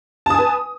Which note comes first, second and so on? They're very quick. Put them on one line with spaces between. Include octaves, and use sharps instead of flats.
A5 D#6 G#5 B4